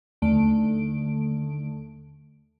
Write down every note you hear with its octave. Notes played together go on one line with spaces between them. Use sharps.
D#2 D3 A3 D7